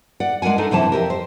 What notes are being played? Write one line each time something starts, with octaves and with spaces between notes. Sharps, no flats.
D5 F#5
G#3 D4 A#4 F#5 G#5
D4 D#4 A4
F#2 C3 E3 C5 A5
F2 G4 A#4
C5